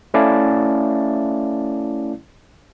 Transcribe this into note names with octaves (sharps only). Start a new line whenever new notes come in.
A3 C#4 E4 D5 F5 A5